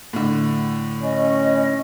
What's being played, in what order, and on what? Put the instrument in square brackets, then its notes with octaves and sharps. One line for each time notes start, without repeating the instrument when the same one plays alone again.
[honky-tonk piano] A2 D3
[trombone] C#4 [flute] D#5